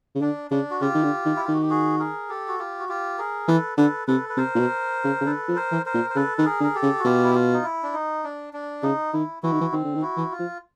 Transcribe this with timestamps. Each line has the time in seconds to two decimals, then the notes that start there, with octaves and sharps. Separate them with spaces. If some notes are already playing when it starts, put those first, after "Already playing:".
0.15 C#3
0.21 D3 D4
0.51 C#3 D4
0.71 F#4
0.81 C#3 F4 G4
0.95 D#3
1.04 D3
1.26 D#3
1.36 E4
1.45 F4
1.48 D#3
1.53 F#4
1.62 G4
1.70 F#4 G#4
2.00 G#4 A#4
2.29 G4 A4
2.48 F#4
2.59 F4 G4
2.79 F#4
2.89 F4 G4
3.18 G#4 A#4
3.48 E3 A4 B4
3.77 D3 A4 B4
4.08 C3 A4 B4
4.29 B4
4.37 C3 A#4 C5
4.55 A#2
4.60 B2
5.05 C#3
5.21 C#3
5.26 D3 A4 B4
5.48 F3
5.56 A#4 C5
5.71 E3
5.86 A#4 C5
5.94 A#2
6.10 C5
6.16 C#3 A4 B4
6.38 D#3 B4
6.45 G#4 A#4
6.60 D3
6.64 A#4
6.75 G4 A4
6.83 C#3
6.99 F#4
7.05 B2 F4 G4
7.24 E4
7.35 F4
7.54 D#4
7.64 E4
7.83 D4
7.94 D#4
8.24 D4
8.53 D4
8.83 C#3 D#4
9.13 D#3 E4
9.43 E3 E4 F#4
9.52 D#3
9.61 E3
9.72 D#3 C4
9.84 D3
9.95 D#3
10.02 E4 F#4
10.17 E3
10.32 F4
10.39 F3